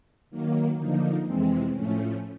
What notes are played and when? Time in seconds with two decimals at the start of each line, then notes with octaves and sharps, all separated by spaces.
0.30 D#3 F#3 A#3
0.77 D3 F3 A#3 D#4
1.25 F2 C3 E3 G#3 C4
1.72 A2 F3 A3 C#4